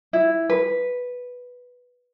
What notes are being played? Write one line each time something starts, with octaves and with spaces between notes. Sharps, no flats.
E4
B4